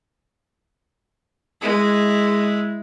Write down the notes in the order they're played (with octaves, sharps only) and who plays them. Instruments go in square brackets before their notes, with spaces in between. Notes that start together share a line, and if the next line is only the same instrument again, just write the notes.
[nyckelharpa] G#3 E4